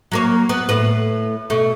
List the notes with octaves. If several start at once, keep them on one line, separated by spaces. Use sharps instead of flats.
F#3 A#3 C#5
B3
A2 B4
B2 A3